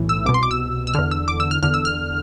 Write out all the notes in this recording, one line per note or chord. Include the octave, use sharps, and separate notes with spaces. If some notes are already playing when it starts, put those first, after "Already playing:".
Already playing: B1 A2 E3
E6
C2 B2 D6
C6
D6
E6
E6
E2 D3 F6
E6
D6
E6
F6
E2 D3 F6
E6
F6